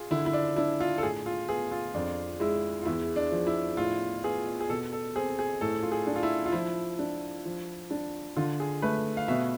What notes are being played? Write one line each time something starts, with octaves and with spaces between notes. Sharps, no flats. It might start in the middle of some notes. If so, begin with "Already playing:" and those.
Already playing: F4 G#4
D3 E4
E4
D4
D4 E4
F4
A4
A2 G#4
F4
B3 G#4
F4
F2 D4
G#3 E4
F4
E2 E4
D4
F3
E4
A2 F4
B3 G#4
G#4
B2 A4
A4
C4 G#4
G#4
A2 A4
F4
G#4
D4
F4
E4
F4
F3 E4
D4
F3
D4
D3 F4
G#4
A3 B4
F5
B2 E5